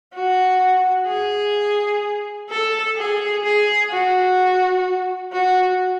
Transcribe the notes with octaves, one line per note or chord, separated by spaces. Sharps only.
F#4
G#4
A4
G#4
G#4
F#4
F#4